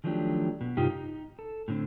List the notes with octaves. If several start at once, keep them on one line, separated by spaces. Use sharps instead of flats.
D#3 F3 F#3 A3 D4 G4
B2
G2 C3 D#4 F4 G4
D#4
A4
A2 D3 C4